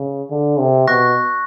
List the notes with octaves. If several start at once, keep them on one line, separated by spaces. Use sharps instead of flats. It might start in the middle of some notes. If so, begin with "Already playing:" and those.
Already playing: C#3
D3
C3
B2 C#6 F#6 A#6